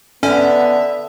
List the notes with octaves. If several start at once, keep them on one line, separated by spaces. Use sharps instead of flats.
D3 B3 C#4 E5